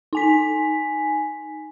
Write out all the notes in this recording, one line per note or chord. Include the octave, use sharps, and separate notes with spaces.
D#4 G#5 B6